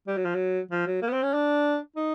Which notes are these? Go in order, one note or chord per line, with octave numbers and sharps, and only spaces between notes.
G3
F#3
F3
F#3
F3
F#3
A#3
B3
C4
C#4
D4
D#4